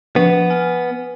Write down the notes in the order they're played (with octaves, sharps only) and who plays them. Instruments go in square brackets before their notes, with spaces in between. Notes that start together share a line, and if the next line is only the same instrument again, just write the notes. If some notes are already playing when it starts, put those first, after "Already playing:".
[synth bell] F3 [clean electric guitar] B3
[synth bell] G#5 F6